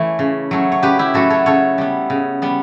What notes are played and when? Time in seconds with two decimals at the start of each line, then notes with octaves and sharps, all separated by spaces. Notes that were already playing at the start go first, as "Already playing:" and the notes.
Already playing: E3 A3 C#5
0.19 C#3
0.51 F#3 A3 C#4
0.72 C#5
0.83 C#3 G4 B4
0.99 E4 G4
1.14 F#3 A3 C#4 F#4 A4
1.30 A4 C#5
1.46 C#3 A4 C#5
1.78 G3 B3
2.10 C#3
2.42 G3 B3